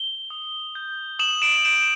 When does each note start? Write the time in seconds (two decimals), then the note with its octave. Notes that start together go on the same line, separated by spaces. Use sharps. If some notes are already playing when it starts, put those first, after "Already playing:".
Already playing: G7
0.30 D#6
0.75 G6
1.19 D#6 E7 F#7
1.42 D7 E7
1.65 G6 D7 E7